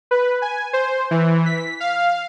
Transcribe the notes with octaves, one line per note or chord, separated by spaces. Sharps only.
B4
G#5
C5
E3
B6
F5